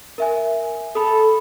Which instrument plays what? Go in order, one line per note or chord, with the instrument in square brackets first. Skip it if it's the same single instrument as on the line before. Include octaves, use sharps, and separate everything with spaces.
[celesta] A#4 E5 G#5
[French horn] A4 [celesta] B5 D#6